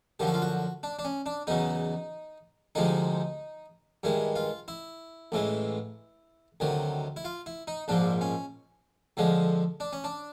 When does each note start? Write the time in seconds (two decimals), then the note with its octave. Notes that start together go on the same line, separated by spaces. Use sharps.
0.20 F#2 D3 F3 G4
0.27 F#4
0.34 F4
0.42 F#4
0.83 D4
0.99 D4
1.05 C#4
1.26 D4
1.47 E2 C#3 F#3 D#4
2.75 D2 C3 F3 G#3 D#4
4.03 G2 D#3 G#3 E4
4.36 F4
4.68 E4
5.32 A1 A2 E3 G#3
6.60 D2 C3 D#3 F#3
7.16 E4
7.24 F4
7.46 E4
7.67 D#4
7.88 A#1 G#2 F3 D4
8.21 C#4
9.17 F2 D3 F3 G#3
9.80 D4
9.93 C#4
10.04 D4